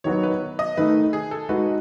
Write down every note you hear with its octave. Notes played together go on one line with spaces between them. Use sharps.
D#3 F#3 B3 F#4 C#5
B4
D#5
D#3 A3 D#4 B4
G#4
A4
G#3 D#4 F#4 B4